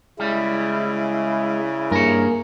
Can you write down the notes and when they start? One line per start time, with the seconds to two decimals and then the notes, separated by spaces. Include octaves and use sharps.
0.19 C#3 G3 G#3 E4
1.91 G2 A#3 G#4 A#4 C#5